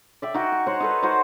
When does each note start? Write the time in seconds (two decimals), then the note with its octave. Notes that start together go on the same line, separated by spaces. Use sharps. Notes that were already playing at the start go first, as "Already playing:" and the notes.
0.22 D5 E5 G5
0.34 D#4 F#4 G5
0.52 C#6
0.67 C5 C#5 F#5
0.80 D#4 A4 B4
1.02 D#4 F#4 C5